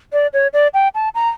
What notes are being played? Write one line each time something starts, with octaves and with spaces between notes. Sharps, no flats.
D5
C#5
D5
G5
A5
A#5